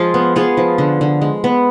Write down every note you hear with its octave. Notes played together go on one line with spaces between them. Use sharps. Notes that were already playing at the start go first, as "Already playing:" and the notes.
Already playing: F3 G#3 F4 G#4
B3
B3 F4 G#4
F3
D3
D3
G#3
B3